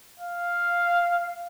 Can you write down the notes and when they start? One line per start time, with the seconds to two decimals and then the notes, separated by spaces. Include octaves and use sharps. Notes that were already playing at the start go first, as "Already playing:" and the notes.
0.20 F5